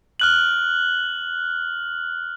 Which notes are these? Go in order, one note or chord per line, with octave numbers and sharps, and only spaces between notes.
F6 F#6 F#7